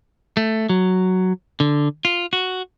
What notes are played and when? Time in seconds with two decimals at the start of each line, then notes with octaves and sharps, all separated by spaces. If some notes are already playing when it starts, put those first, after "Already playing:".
0.37 A3
0.69 F#3
1.60 D3
2.05 F4
2.33 F#4